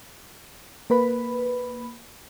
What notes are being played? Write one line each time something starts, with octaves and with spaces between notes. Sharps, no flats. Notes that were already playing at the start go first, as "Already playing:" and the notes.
A#3 B4 B5